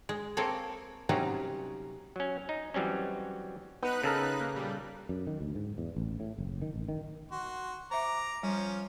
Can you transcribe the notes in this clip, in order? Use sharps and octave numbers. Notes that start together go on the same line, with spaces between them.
G#3
A#3 C4 A4 C#5
C3 F#3 G3 C4 C#4 D#4
F#3 C#4
D#4
E3 F#3 G3 C4 C#4
B3 D#4 B4 F#6
C#3 A4 A#4
A#3
A#2 G3
F#2
D#3
D2
G#2
E2
A1
A2
F#1
D#3
A1
D#3
F#4 C6
C5 E5 A#5 D6
F3 G3 C#4